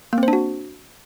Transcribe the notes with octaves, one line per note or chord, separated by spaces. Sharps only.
A#3
C4
C5
D4
F#4